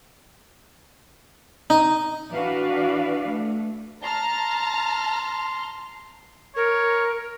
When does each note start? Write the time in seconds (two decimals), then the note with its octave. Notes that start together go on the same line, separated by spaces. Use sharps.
1.70 D#4
2.31 E3 D4 F#4 B4 D5 F5
3.26 A3
4.03 A5 A#5 C6 F6
6.56 A#4 C#5